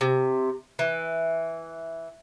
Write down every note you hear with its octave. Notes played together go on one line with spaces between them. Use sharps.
C3
E3